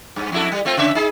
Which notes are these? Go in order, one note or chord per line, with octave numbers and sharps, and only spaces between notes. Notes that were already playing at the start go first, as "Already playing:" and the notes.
G2
F2 E4 A4
G3
A3 C4 F4
C#3 C#4 E5
D#4 G#4